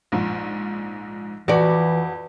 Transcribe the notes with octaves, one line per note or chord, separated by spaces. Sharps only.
A#1 G#2 F3
F2 E3 F#4 D5